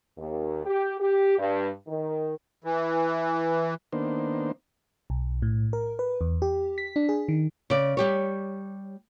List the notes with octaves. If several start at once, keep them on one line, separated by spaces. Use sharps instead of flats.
D#2
G4
G4
G2
D#3
E3
D#3 A#3 B3 D4 C5
B1
A2
A#4
B4
E2
G4
B6
D4
G#4
D#3
C#3 D5
G3 G4 C#5